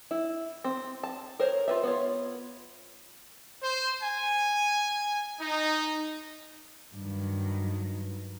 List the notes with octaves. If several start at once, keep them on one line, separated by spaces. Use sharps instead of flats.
E4
C4
A5
A#4 C5 C#5
F4 B4 E5
B3 F4 C#5
C5
G#5
D#4
G2 D#3 F#3